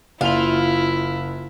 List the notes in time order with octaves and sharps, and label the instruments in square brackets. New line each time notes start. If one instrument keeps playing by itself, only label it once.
[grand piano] F#1 F7 [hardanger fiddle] E4 [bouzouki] F4